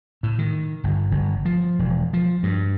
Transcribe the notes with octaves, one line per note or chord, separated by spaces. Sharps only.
A2
D#3
G1
G1
F3
E1
F3
G2